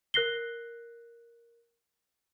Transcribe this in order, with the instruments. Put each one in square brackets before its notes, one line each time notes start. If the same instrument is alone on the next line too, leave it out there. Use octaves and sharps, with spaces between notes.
[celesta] A#4 F#6 A#6 C7 G7